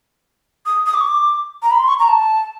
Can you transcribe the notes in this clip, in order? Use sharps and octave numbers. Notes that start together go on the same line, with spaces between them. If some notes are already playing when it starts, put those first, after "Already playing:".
D#6
D#6
D6
C#6
D6
A#5
B5
C6
C#6
A#5
A5